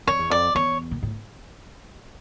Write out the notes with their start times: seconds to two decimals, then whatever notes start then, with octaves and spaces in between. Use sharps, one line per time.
0.07 F2 C#5
0.19 E2
0.30 F2 D5
0.55 E2 C#5
0.91 A#2
1.03 A2